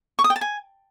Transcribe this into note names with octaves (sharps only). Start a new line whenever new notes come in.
C#6
D#6
G5
A5
G#5